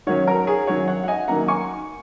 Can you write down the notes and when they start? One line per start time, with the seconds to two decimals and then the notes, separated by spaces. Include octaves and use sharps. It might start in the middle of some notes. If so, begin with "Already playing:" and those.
0.07 D#3 F#3 C#4 C#5 F#5
0.27 F#4 A#4
0.47 G#4 C#5
0.67 D#3 F#3 C#4 C#5 F#5
0.87 C#5 F#5
1.03 F#5
1.08 D#5 G#5
1.28 D#3 F#3 A#3 C#4 F#5 A#5
1.48 G#5 C#6